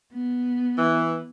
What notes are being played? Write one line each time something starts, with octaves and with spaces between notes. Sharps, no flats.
B3
E3